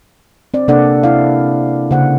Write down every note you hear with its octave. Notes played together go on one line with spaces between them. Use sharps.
C4 D5
C3 A#3 D4 A4 D5 F#5
E4 F5
C#3 A#3 C5 F#5